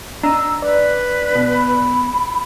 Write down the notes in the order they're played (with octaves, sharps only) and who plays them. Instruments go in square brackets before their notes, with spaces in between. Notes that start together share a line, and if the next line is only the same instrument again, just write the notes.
[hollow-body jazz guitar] D4 D#5 [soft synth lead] A#5 [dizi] E6
[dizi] B4 [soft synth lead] D5
[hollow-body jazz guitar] B2
[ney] B5